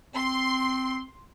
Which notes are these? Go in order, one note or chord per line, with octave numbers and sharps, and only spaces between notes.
C4 C6